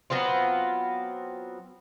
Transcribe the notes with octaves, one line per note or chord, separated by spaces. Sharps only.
F#3 B3 C4 F4